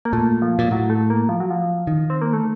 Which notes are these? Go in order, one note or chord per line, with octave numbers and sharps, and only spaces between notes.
A#3
A#2 A3
F3
A#2
A2 F#3
A3
A#3
F3
F#3
F3
D#3
C4
A#3
A3